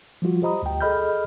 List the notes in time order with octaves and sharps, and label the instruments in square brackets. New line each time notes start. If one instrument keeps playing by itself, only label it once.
[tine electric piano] F3 G3 F4 F#4
G4 C5 D#5 A#5 B5 D#6
D2 G5
G#4 A4 D#5 B5 F6 G6